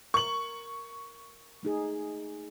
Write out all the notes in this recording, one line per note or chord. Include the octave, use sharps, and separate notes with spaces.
A#4 C#6 F#7
A3 D#4 G#4